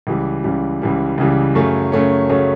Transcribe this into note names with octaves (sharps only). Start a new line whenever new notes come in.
C#2 C#3 E3 G3
C#2 C#3 E3 G3
C#2 C#3 E3 G3
C#2 C#3 E3 G3
F#2 C#3 F#3 A3 C#4
F#2 C#3 F#3 A3 C#4
F#2 C#3 F#3 A3 C#4